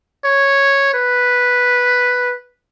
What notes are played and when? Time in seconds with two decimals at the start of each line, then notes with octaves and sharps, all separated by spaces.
0.24 C#5
0.94 B4